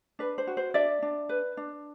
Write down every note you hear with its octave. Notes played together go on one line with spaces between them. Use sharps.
D4 B4
C5
F#4
C5
D4 D5 E5
D4
B4
D4